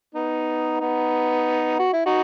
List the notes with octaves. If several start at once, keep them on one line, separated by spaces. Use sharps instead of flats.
B3 D#4
B3 D#4
F#4
E4
D#4 F#4